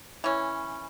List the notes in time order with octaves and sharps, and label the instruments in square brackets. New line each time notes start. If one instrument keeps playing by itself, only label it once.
[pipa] E3 C#4